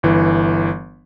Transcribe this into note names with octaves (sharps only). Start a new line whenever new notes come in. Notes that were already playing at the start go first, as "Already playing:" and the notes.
G1 E3